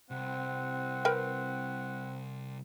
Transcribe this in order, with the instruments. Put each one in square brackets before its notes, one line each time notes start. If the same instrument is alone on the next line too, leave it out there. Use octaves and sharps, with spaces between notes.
[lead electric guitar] C2 [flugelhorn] C4 [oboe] F#5
[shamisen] A#4 B4 G5